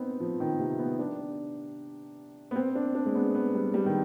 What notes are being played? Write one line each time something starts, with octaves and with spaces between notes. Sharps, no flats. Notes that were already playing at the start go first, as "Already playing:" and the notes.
Already playing: B3 C4 D#4
F3
D#3
C3
B3
D4
B3
C4
D4
D4
G#3
B3
B3
G3
G3
D#3